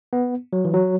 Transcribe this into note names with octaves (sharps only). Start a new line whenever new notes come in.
B3
F#3
E3
F#3